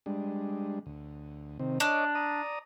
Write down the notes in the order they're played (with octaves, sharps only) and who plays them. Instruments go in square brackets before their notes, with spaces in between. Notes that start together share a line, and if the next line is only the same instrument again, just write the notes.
[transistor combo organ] G3 G#3 D4
D2
C3 D#3 C4
[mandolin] D4 [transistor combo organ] C#5 D#5 D6
[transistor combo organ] D5 A#5 D#6